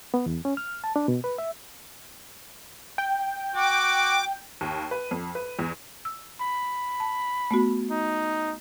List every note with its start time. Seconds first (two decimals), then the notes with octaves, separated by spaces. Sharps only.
0.14 B3
0.26 E2
0.45 C#4
0.57 F6
0.84 A5
0.96 D4
1.08 B2
1.24 B4
1.38 E5
2.98 G5
3.56 F#4 D6
4.61 D#2
4.91 B4
5.11 F2
5.35 B4
5.59 E2
6.05 E6
6.41 B5
7.00 A5
7.51 A3 B3 F#4
7.91 D#4